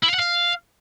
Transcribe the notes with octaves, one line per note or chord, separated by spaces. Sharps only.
E4
F5
F#5
F5